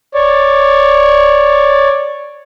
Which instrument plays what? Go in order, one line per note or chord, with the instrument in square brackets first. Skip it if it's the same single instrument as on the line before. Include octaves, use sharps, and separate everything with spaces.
[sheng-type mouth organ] C#5 D5